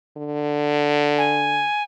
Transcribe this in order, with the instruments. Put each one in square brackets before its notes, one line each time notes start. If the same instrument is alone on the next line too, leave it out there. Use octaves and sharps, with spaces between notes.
[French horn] D3
[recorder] G#5